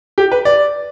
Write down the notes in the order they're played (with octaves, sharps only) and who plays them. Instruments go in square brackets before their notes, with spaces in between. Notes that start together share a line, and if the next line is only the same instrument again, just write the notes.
[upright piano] G4
B4
D5